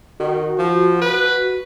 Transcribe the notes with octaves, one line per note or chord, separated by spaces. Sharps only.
D#3 F#4
F3
B4